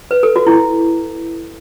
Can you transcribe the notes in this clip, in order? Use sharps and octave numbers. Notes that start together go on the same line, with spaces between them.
B4
A4
F#4
E4